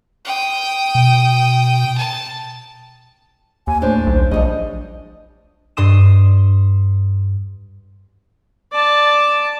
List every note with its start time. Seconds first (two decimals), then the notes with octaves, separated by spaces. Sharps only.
0.25 G5 D#6
0.95 B2
1.97 A5
3.67 D#2 G#5
3.82 A2 D4 C5
4.06 B1
4.31 A#1 G2 B2 D4 D#5
5.77 G2 C6 D#6 E7
8.72 D5 A5